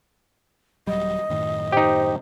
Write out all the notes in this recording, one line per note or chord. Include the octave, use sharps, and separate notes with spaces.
D#1 F#3 G3 D#5
F#2 A2 D#3
D#4 G4 C5